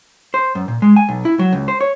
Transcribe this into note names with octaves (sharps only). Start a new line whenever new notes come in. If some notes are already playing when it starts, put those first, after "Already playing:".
C5
F#2
A#2
G#3
G#5
B1
E4
F#3
C#2
C5
C#5